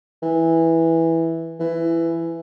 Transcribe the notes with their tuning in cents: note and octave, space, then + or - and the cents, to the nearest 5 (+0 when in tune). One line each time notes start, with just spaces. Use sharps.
E3 -5
E3 +15